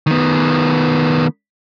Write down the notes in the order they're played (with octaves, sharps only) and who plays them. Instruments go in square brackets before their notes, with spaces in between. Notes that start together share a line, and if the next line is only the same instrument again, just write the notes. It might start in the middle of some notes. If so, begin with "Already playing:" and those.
[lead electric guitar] D#3 B3